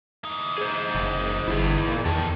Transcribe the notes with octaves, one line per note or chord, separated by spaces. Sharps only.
E3 D#4
G#4 C5
F#1
G1 E4 G#4
A#2
E2 D#3 G4 A4